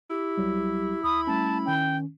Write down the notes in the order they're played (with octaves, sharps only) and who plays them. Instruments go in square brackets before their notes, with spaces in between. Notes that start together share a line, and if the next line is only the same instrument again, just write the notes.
[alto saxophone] E4 [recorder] G4
[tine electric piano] B1 F#3 G3
[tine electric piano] D2 [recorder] B5 [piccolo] D#6
[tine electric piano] G3 A3 C#4 [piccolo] A5
[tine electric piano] D#3 C#4 [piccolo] G5